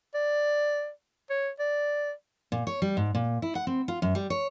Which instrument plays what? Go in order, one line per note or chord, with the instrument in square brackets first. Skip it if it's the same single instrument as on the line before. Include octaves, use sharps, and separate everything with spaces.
[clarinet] D5
C#5
D5
[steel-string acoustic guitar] A#2
C#5
G3
G#2
A#2
E4
F#5
C4
F4
F#2
G3
C#5